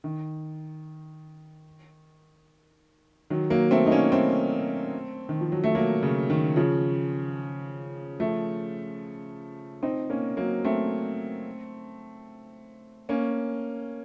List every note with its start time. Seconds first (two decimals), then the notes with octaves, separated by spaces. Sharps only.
0.04 D#3
3.30 D#3 F#3
3.50 F#3 A#3
3.71 A3 C4
3.86 D#4
3.91 A#3 C#4
4.12 A3 C4
5.29 D#3
5.41 F3
5.52 F#3
5.64 A3
5.75 F#3 A#3
6.03 C#3
6.30 D#3
6.56 C#3 F3
8.20 F3 A3
9.83 C4 D#4
10.10 A#3 C#4
10.37 F#3 A#3
10.65 A3 C4
13.09 A#3 C#4